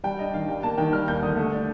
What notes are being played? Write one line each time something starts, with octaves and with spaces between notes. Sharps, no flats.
G3 G5
D4 D#5
D#3 F5
G3 G5
A#3 A5
D#3 G5
G3 F6
D#2 G6
D3 D#6
A3
D4